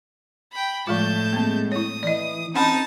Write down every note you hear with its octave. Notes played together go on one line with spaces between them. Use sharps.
G5 B5
A2 F3 G#3 F4 A5 G6
G#3 A#3 C4
E4 C#5 D#6
E3 D5 D#5
C4 C#4 D#4 F#5 A5 B5